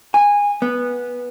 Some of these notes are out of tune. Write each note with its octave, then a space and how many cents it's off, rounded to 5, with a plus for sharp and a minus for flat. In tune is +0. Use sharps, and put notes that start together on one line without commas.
G#5 -20
B3 -10